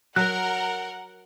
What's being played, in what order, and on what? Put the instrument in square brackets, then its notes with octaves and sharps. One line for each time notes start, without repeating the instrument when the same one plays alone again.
[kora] F#3 [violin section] A#4 [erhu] F#5 [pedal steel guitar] F#6